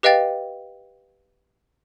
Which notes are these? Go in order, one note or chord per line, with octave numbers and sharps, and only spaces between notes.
G4 B4 D#5 F5 G5 A6